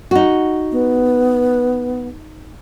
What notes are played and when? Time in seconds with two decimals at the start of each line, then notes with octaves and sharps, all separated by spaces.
0.11 D#4 F#4
0.72 B3